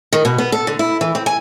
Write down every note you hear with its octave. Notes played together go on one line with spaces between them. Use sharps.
D#3
B2
B3
A4
D3
E4
E3
C4
G#5